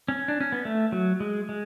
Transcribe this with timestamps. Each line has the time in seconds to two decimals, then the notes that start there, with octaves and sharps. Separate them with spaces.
0.08 C#4
0.28 D4
0.40 C#4
0.52 B3
0.65 A3
0.92 F#3
1.20 G#3
1.49 G#3